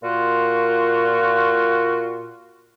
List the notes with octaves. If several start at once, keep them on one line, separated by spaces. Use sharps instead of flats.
A#2 F4 F#4